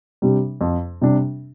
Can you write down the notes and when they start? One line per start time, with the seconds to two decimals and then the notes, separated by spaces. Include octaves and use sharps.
0.22 C3 G3 D4
0.61 F2
1.01 C3 G3 D4